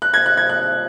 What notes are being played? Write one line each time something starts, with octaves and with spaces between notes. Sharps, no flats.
F#6
G#6
F#6
G#6
F#6